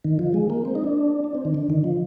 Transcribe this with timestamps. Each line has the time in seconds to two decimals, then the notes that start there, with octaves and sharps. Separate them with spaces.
0.04 D#3
0.19 F3
0.34 G#3
0.50 A#3
0.65 C4
0.75 D#4
0.84 D4
1.24 D4
1.35 C4
1.45 D#3
1.54 D3
1.70 D#3
1.84 F3